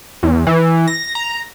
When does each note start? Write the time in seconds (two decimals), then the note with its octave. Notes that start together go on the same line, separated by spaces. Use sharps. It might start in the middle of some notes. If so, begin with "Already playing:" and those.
0.23 E2
0.47 E3
0.88 A#6
1.15 A#5